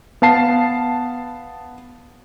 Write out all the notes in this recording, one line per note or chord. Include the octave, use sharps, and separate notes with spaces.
B3 F5 A5 C7